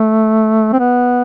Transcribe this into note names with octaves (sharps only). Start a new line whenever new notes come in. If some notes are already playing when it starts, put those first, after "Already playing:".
Already playing: A3
C4
B3